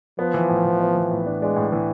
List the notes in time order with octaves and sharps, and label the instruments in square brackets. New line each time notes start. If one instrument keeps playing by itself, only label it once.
[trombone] F3 [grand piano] B3
[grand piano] E3
A2
E3
B3
E3
A2
D4
[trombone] G#3 [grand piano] D4
[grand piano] A2
E3